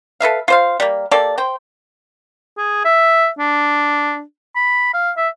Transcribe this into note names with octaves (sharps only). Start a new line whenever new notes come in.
A4 B4 E5 F5
F4 C5 F5
G3 A#3
A#3 G4 A4 D5
C5 G5
G#4
E5
D4
B5
F5
E5